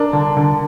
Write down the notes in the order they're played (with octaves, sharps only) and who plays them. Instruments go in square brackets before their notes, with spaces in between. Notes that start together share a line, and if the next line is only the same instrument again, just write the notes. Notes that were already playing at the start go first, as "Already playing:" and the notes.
Already playing: [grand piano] D4 [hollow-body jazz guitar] A#4
[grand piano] D3
D3